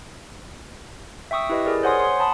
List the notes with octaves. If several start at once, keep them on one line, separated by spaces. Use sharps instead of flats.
E5 G5 C#6 D#6 E6
E4 G4 B4 D#5
G#4 A#4 D5
C5 C#5 F#5 G#5 C6 D#6
C6
F#5 A5 B5 D#6